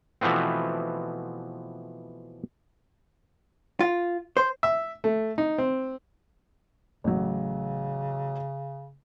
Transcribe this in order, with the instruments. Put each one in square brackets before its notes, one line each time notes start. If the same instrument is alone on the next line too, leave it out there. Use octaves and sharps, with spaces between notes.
[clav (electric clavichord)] B2 E3 F3 A3 B3 C4
[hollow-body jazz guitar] F4
C5
[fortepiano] E5
A3
D#4
C4
[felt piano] A1 F#3 [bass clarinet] C#3